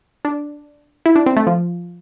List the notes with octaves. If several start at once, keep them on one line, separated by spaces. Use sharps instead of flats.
D4
E4
D4
C4
A3
F3